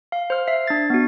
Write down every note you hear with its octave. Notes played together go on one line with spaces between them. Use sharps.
F5
C5 F6
E5 C7
D4 A6
B3 F#4